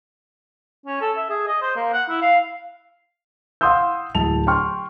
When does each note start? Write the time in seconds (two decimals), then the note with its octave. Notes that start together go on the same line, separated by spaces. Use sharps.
0.86 C#4
1.01 A4
1.17 E5
1.29 G#4
1.47 D#5
1.61 C5
1.76 A#3
1.93 F#5
2.09 E4
2.22 F5
3.61 F5 F#5 C6 D#6 E6 G6
4.15 D1 A5 F7
4.47 G5 C6 C#6 F6